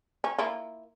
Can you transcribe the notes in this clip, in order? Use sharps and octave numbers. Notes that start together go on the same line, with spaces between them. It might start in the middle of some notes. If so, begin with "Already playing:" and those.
C#4
A#3 E4 F4